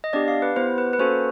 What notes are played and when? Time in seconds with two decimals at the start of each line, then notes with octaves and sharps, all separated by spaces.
0.04 D#5
0.13 B3 D4 G4 D5
0.28 F5
0.42 B4
0.56 B3 E4 G4 C5
0.78 B4
0.93 B4
0.99 A#3 C#4 F#4 A4 C5